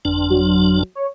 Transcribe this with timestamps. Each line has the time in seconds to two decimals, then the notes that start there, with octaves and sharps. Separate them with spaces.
0.05 G1 F2 D4
0.30 F#3
0.95 C#5